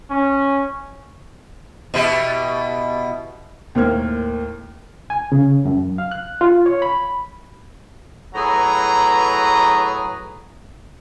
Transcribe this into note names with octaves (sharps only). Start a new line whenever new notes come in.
C#4
B2 E4 G4
D#2 A2 A#3 C5 F6 G#6
G#5
C#3
F#2
F5
F#6
F4
C#5
B5
A2 F#3 G#4 B4 A#5